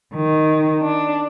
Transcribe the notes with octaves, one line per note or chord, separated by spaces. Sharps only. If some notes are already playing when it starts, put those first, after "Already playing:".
D#3
D4